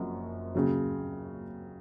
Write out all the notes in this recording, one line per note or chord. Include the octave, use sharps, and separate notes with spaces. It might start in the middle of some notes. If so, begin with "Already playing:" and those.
Already playing: F#1 F#2 F3 C4 F#4
D#2 C#3 F#3